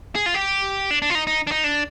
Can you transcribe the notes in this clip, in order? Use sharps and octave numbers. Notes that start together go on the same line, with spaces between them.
G#4
F4
G4
D4
D4
F4
D#4
D#4
D4
D#4
D4